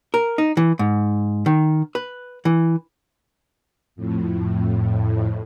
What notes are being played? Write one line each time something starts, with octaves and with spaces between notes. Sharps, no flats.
A#4
D#4
E3
G#2
D#3
B4
E3
F2 A2